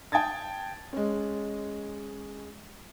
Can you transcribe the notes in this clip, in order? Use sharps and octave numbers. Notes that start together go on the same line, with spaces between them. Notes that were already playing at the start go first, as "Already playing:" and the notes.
G5 A5 D#6 G#6 A6
G#3 C#4